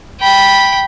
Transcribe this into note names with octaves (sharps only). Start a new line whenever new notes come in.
G5 B5